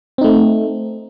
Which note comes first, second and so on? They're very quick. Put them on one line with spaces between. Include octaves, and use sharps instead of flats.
C4 D#4 A3